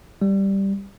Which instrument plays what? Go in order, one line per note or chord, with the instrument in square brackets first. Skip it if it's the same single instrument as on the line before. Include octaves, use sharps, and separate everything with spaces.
[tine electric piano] G3